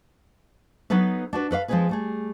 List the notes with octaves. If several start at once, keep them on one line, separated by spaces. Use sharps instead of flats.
F#3 B3 D#4 A4 B4
D4 F#4 B4
A4 B4 C#5 F5
F3 G#3 A#3 C4 G#4 B4
G3 A3 G#4